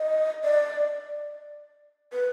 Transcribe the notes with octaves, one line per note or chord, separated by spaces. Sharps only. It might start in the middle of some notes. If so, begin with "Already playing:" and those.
Already playing: D#5
D5
B4